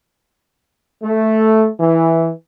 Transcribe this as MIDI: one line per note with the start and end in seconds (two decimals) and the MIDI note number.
1.03 1.67 57
1.79 2.29 52